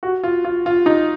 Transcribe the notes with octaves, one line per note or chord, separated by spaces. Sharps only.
F#4
F4
F4
F4
D#4